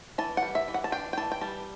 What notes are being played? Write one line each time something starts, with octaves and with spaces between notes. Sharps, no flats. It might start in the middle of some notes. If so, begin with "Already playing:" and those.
E3 A5
F#5
G3
E5
E3
F#5
A5
D4 G5
G5
E3 A5
G5
G3 A5